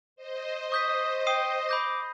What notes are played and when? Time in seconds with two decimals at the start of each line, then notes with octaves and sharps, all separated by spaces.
0.16 C5 D#5
0.72 C#6 D#6 G6 B6
1.27 G5 D#6 C7 D#7
1.69 B5 D6 G6 A#6